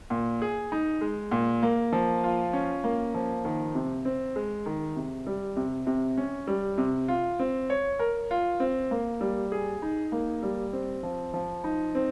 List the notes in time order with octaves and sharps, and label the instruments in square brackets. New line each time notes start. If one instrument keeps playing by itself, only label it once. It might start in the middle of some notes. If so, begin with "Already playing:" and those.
[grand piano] A#2
G#4
D#4
G#3
A#2
A#3
F3
F4
C#4
A#3
F3
D#3
C3
C4
G#3
D#3
C3
G3
C3
C3
C#4
G3
C3
F4
C4
C#5
A#4
F4
C4
A#3
G3
G#4
D#4
A#3
G3
C4
F3
F3
D#4
C4